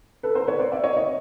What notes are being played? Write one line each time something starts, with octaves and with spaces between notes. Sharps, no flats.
A4 B4
A#4 C5
B4 C#5
C5 D5
D5 E5
C#5 D#5
C#5 D#5